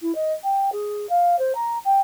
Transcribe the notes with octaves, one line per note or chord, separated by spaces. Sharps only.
E4
D#5
G5
G#4
F5
C5
A#5
G5